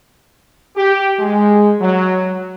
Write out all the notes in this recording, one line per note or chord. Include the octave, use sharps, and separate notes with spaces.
G4
G#3
F#3